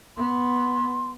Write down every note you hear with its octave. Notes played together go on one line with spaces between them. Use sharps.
B3 C6